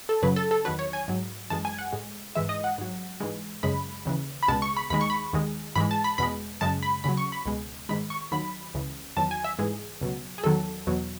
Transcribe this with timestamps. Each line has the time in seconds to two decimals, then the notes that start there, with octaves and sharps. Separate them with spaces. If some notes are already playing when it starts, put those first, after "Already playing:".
0.09 A4
0.22 F#2 C#3 F#3 B4
0.36 A4
0.51 A4
0.65 E2 D#3 F#3 B4
0.79 C#5
0.93 G#5
1.08 G#2 F#3
1.50 F#2 E3 G#3 A5
1.65 G#5
1.78 F#5
1.93 A2 G#3
2.35 G#2 E3 G#3 E5
2.49 D#5
2.64 F#5
2.78 G#2 F#3
3.20 G#2 E3 G#3
3.63 F#2 C#3 G#3 B5
4.05 D#2 C#3 E3
4.43 B5
4.48 C#2 B2 G#3 A5
4.62 C#6
4.77 B5
4.90 D#2 D#3 G#3 B5
5.01 C#6
5.10 B5
5.33 D#2 D#3 G#3
5.76 G#2 E3 G#3 B5
5.91 A5
6.04 B5
6.18 E2 B2 G#3 B5
6.61 F#2 C#3 G#3 A5
6.83 B5
7.04 D#2 C#3 F#3 B5
7.17 C#6
7.32 B5
7.46 C#2 B2 G#3
7.89 G#2 D#3 G#3 B5
8.10 C#6
8.31 D#2 D#3 F#3 B5
8.74 C#2 C#3 E3
9.17 E2 D#3 F#3 A5
9.31 G#5
9.44 E5
9.59 G#2 E3 G#3 G#4
10.01 C#2 B2 F#3
10.38 G#4
10.44 E2 D#3 F#3 A4
10.87 E2 B2 F#3